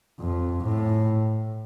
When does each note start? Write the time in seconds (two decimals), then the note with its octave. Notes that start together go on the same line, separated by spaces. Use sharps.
0.20 F2
0.62 A2